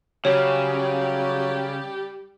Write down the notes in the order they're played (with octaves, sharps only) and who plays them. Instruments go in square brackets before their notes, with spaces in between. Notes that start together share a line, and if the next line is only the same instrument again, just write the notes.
[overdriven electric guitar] C#3 [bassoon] F#3 [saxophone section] G3 G4 [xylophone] C#5